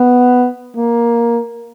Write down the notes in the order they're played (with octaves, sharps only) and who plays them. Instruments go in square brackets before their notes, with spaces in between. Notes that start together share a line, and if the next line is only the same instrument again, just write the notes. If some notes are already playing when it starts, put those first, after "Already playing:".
Already playing: [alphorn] B3
A#3